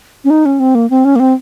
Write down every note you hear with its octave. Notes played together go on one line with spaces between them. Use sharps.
C#4
D#4
C#4
C4
A#3
C4
C#4
A#3
C4